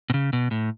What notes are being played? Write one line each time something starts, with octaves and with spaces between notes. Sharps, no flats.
B2
C#3
B2
A2